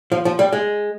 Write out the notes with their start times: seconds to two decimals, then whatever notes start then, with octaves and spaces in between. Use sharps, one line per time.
0.12 F3
0.25 F3
0.39 G3
0.53 G#3